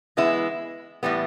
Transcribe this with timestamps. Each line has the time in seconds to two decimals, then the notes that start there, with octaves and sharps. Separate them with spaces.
0.17 E3 G#3 B3 E4
1.03 A2 E3 G3 B3